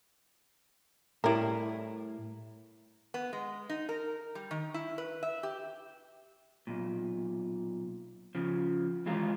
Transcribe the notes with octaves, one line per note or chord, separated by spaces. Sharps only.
A2 G3 E4 A#4
B3
G#3
D#4
A#4
G3
D#3
E4
B4
E5
G4
B1 A#2
C#3 F3
D#2 E3 G#3 F4 A#4